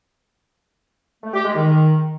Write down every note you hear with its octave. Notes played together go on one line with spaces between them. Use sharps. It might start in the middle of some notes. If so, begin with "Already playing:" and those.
A3
G4
G#3
D#3